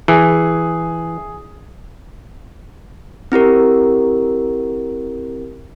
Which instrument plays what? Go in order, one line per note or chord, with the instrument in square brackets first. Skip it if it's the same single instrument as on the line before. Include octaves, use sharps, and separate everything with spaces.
[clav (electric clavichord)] E3 [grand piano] G#4
[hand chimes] C4 E4 G4 A#4